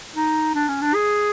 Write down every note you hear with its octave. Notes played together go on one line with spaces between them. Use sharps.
D#4
D4
C#4
D4
G#4